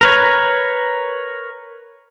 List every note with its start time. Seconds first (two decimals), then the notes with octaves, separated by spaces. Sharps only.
0.01 A#4 B4 C#5